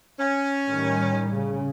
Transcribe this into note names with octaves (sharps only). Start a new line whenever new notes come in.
C#4
A2 D#3 G3
C#3